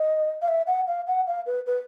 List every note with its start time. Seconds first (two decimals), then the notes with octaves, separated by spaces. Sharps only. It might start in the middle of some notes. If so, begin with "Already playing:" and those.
Already playing: D#5
0.42 F5
0.48 E5
0.67 F#5
0.87 F5
1.07 F#5
1.27 F5
1.46 B4
1.67 B4